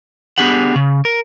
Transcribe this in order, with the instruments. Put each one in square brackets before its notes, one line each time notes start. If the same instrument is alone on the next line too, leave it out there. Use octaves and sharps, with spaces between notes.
[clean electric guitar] B3 D4 G4 G#4 F#5
C#3
A#4